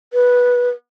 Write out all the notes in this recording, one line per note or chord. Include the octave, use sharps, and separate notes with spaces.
B4